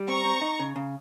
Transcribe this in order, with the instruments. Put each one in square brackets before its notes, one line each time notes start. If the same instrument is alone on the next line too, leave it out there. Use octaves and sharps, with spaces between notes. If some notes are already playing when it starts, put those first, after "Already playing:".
Already playing: [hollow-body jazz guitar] G3
[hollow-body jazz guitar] C4 [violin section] A#5 C#6
[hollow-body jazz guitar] C4
D#4
C#3
C#3